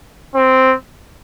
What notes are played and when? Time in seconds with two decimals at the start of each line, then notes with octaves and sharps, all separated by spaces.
0.35 C4